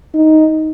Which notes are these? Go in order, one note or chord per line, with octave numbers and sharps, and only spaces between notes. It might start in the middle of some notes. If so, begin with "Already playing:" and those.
D#4